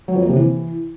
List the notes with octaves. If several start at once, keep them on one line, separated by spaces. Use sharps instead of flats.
F#3
F2
A#3
C3
E3